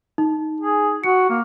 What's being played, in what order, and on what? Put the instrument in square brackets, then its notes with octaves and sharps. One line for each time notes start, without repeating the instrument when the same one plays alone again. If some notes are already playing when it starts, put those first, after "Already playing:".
[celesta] D#4
[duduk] G#4
[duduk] F#4 [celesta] C#7
[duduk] A#3